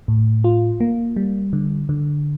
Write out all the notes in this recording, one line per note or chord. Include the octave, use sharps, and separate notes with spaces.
A2
F4
A#3
G3
D3
D3